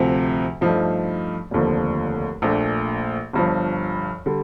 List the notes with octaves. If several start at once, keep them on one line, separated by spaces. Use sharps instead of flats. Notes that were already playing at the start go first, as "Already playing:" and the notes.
Already playing: D2 C3 F3 C4
G2 F3 A3 D#4
F1 D#2 D3 F3
A#1 A#2 A3 D4
G1 G2 F3
D3 G3